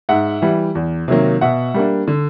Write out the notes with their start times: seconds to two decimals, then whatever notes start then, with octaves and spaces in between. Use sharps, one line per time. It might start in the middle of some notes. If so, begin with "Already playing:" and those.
0.09 G#2 E5 F#5
0.42 E3 G3
0.75 E2
1.08 C3 D#3 F#3 A#3
1.41 B2 E5 F#5
1.74 G3 A#3 D4
2.08 D3